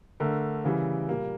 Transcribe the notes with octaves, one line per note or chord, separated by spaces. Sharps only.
D3 A3 A#4
C#3 E3 G3
A#2 G3 A#3